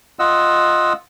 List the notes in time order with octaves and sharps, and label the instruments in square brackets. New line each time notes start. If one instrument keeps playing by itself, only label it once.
[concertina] F4 D#5 F#5 E6